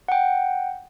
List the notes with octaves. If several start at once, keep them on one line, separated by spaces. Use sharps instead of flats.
F#5 G5